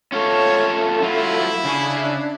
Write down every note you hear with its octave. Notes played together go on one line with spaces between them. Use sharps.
A3 C#4 F4 A4 C#5
F#3 E4 F4
C#3 D4 G#4